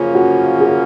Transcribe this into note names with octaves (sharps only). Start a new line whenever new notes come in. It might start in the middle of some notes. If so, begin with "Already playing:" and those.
Already playing: F#2 C#3 F3 A#3 C#4 F4
F#4
G#4